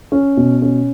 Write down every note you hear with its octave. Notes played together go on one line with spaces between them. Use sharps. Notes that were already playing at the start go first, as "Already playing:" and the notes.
C#4
B2
C#4